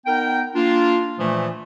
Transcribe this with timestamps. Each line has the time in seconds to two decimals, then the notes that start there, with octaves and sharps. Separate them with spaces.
0.06 B3 D#4 A#4 G5
0.55 A#3 D4 F4
1.19 A#2 E3 F3 A3